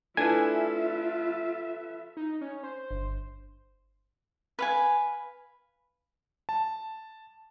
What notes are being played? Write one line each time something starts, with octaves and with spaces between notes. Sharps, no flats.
A3 D4 E4 F4 A4 B4 E5 G#5
D#4
C#4
C5
G1
B4 F5 G#5
A5